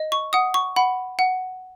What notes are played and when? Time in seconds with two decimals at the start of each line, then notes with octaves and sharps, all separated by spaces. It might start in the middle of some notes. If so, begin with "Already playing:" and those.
Already playing: D#5
0.12 C#6
0.33 F#5 D#6
0.54 C#6
0.76 F#5 B5
1.19 F#5